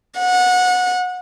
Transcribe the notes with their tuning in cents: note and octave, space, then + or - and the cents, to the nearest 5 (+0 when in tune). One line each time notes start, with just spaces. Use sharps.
F#5 -25